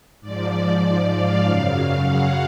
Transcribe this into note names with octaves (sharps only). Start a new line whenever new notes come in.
G#2 F3 D5
F5
F#2 C#3 F#3
F#5